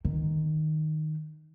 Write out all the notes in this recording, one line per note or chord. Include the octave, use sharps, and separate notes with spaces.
D#3